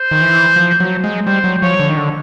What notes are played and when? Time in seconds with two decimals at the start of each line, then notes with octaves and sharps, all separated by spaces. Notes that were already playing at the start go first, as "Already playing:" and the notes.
Already playing: C5
0.11 D#3
0.22 E3
0.56 F3
0.80 F#3
1.04 G#3
1.26 G3 C5
1.44 F#3
1.62 F3 C#5
1.79 D3
1.89 D#3
1.97 D3